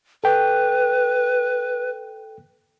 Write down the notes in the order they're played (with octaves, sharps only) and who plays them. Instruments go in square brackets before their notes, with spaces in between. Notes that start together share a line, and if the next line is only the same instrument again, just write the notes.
[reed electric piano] A4 G5 [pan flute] B4